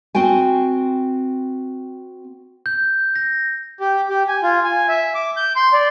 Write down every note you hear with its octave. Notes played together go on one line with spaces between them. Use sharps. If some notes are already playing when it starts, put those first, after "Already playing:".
C4 F#4 G5 G#5
G6
A#6
G4
G4
G#5
F4
G#5
E5
D6
G6
C6
D5